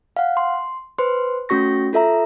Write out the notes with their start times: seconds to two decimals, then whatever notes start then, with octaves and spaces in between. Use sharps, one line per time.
0.17 F5 F#5
0.37 C6
0.98 B4 C5 C6
1.49 A3 C#4 F#4 C#6 A#6
1.93 F4 A4 E5 A#5